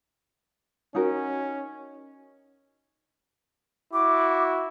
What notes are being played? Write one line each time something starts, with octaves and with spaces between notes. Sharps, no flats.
C#4 D#4 F#4 A#4
E4 F#4 D6